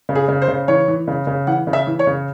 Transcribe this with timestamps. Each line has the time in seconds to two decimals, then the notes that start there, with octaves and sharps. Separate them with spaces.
0.09 C#3
0.15 G#4
0.28 C#3
0.42 C5
0.48 C#3
0.68 E3 C#5
0.88 E3
1.08 C#3
1.27 C#3
1.47 E3 F#5
1.67 C#3
1.73 E5
1.87 E3
1.99 C#5
2.07 C#3